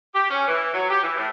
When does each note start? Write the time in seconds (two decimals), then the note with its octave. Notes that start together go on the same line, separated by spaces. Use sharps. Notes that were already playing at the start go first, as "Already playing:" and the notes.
0.14 G4
0.29 C#4
0.48 E3
0.74 F#3
0.90 G4
1.03 E3
1.17 A2